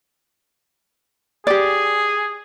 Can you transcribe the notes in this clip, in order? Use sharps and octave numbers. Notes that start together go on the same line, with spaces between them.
G4 G#4 D5